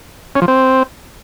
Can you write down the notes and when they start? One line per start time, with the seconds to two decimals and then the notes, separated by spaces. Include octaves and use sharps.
0.36 C#4
0.42 F3
0.48 C4